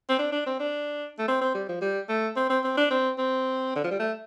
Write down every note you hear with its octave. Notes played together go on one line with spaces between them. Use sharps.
C4
D4
D4
C4
D4
A3
C4
C4
G3
F3
G3
A3
C4
C4
C4
D4
C4
C4
D3
F3
G3
A3